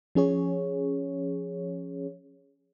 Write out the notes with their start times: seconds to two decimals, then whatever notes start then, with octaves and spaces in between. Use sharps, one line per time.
0.15 F3 C#4 G#4 C#5